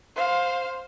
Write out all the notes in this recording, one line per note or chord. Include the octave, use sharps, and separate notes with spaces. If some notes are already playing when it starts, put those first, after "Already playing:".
C5 F5